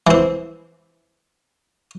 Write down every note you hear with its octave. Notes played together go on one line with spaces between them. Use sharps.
E3 C4